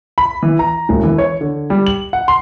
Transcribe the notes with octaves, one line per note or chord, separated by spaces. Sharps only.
B5
E3
A#5
E1
E3
C#5
D3
G3
F#7
F#5
C6